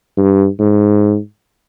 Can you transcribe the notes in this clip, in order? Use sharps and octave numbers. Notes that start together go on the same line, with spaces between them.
G2
G#2